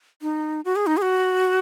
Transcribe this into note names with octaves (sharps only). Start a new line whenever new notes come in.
D#4
F#4
G#4
D#4
G#4
F#4